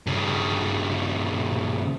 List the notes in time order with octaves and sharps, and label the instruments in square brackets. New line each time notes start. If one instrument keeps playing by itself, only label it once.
[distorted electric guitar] G2 C#3